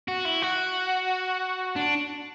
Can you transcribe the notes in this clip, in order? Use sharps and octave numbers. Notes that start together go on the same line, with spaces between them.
F#4
E4
F#4
D4